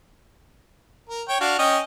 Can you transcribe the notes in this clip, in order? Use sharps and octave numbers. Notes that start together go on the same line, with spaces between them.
A#4
C#5 G5
D4 F#4 F5
C#4 D#5 G5